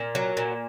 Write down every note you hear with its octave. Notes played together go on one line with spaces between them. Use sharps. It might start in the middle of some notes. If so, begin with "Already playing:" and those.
Already playing: A#2 A#4
F#3
A#2